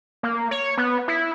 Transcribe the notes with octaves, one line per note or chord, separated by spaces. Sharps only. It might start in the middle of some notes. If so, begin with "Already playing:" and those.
A#3
C#5
B3
E4